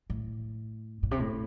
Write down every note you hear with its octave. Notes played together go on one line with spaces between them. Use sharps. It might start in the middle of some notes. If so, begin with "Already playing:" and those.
A2
A2
C3
A2